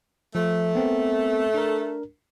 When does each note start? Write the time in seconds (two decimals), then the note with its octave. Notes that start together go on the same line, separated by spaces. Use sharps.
0.35 F3 A3
0.75 B3 C4 A#4
1.54 D4 A#4